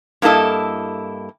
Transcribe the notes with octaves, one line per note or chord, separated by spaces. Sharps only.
G2 A#3 E4 A4 D#5